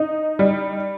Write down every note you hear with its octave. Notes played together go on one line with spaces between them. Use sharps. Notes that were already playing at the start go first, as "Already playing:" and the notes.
Already playing: D#4
G3